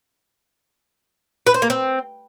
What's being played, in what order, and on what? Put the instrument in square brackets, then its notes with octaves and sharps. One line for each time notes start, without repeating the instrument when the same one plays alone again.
[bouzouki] B4
C5
A#3
C4